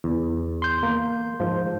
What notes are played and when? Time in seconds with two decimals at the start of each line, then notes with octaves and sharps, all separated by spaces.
0.04 E2
0.62 C6 G6
0.83 A#3
1.40 G#2 F3